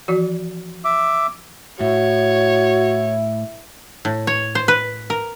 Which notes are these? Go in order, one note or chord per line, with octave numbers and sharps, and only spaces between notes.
E3 F3 F#4
E5 D6
A2 E4 F#4 C#5
A2
C#5
C5
B4
A#4